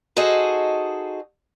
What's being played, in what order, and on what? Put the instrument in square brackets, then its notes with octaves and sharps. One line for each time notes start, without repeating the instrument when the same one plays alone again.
[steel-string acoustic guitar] D#4 F#4 G#4 A4 C5 D#5